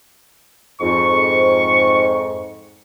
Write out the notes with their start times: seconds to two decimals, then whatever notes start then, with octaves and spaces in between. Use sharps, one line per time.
0.81 F2 G#2 C#6